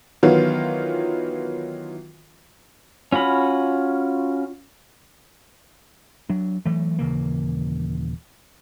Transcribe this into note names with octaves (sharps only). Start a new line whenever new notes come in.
D#3 E3 F#3 B3 F4
C#4 F4 F#4 B5
F#3 D4
E3 F#3 A3
D#1 C#3 E3 A#3